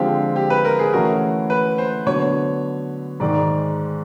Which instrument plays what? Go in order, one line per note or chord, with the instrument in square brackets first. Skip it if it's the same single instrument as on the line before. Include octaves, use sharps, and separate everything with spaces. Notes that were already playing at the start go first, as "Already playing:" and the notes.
Already playing: [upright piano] D3 F3 G#3 C4 F4 [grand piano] G4
[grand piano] G4
B4
A#4
G#4
[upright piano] E3 A3 C#4 F#4 [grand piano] A#4
[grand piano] B4
C5
[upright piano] D3 F#3 B3 [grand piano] C#5
[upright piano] G#2 D#3 G#3 [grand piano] D5